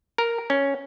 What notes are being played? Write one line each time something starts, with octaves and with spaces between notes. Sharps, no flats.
A#4
C#4